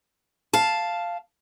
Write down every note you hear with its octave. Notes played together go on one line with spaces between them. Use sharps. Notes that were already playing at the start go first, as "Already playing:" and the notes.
F5 A5